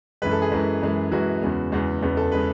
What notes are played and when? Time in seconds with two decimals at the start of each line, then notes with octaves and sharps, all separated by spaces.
0.22 F#2 E3 G#3 B4
0.31 A4
0.42 G#4
0.52 F#2 E3 G#3
0.82 F#2 E3 G#3
1.12 F#2 E3 G#3 F#4
1.42 E2 C#3 G#3 B3
1.72 E2 C#3 G#3 B3
2.02 E2 C#3 G#3 B3
2.17 A4
2.32 C#3 G#3 B3 B4